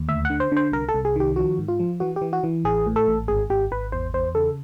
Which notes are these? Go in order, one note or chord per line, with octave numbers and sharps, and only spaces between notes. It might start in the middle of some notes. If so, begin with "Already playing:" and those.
Already playing: D#2
D2 E5
D3 F#5
C5
D3 C5
C2 A#4
A4
C2
G#4
D#3 G4
F3 F#4
G#2
F4
F3
E3 F#4
G4
E3
F#4
E3
A1 G#4
A2
A4
A1
G#1 G#4
G#1 G4
G#1 B4
E2 C5
E2 C5
C#3 A4